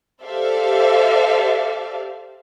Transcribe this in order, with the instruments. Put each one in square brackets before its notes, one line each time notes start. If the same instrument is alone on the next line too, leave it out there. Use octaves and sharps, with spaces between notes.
[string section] G4 A4 C5 D5 E5 F5